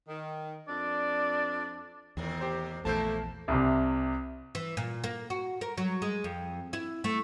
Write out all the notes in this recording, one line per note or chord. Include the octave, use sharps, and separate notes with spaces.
D#3
F2 D4 D5
E2 A2 C3 D#3
G4 C5
A#1 E2 A3 A#3 E4 C5 A5 G6
C2 C3
E3
A#2
A#3
F#4
A#4
F#3
G#3
F2
E4
A3